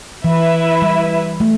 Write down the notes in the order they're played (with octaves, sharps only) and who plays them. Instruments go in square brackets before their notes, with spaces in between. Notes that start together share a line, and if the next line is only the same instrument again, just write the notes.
[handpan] E3 [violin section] E4 B4 E5
[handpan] G3
A3